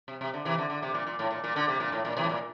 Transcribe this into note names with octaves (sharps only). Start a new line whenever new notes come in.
C3
C3
D3
C3 E3
D3
D3
C3
A#2
A#2
A2
A#2
A#2
D3
C3
A#2
A2
A#2
C3 E3
A2
A#2